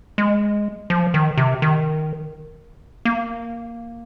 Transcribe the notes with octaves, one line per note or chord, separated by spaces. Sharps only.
G#3
F3
D#3
C3
D#3
A#3